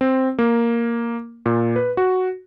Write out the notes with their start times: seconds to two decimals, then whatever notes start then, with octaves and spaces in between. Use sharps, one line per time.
0.01 C4
0.39 A#3
1.46 A#2
1.76 B4
1.97 F#4